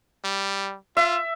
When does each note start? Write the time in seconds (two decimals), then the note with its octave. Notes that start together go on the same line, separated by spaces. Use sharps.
0.24 G3
0.97 F4 E5